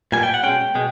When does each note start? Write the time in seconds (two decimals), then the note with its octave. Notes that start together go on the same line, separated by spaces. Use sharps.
0.12 A#2 G3 B3 G#5
0.23 G5
0.34 F#5
0.43 B2 G#3 C#4 G5
0.75 B2 G#3